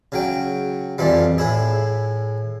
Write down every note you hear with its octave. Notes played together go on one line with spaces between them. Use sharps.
C#3 F#3 G5
F2 E3 F3 G3
A2 E4 G#4